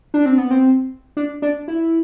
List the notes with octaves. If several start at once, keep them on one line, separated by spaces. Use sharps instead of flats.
D4
C4
B3
C4
D4
D4
E4